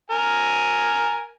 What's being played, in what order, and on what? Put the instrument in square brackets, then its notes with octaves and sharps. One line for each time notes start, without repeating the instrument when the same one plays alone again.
[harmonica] A#4 G#5